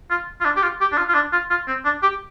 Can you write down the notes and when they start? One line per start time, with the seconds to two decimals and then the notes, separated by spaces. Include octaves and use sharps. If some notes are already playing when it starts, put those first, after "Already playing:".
0.10 F4
0.41 F4
0.45 D4
0.56 G4
0.63 F4
0.81 G4
0.92 D4
0.98 F4
1.09 F4
1.14 D4
1.32 F4
1.50 F4
1.68 C4
1.85 D4
2.02 G4